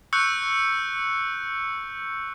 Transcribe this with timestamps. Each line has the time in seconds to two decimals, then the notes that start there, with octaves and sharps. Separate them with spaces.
0.13 C#6 E6 F#6 G6 C#7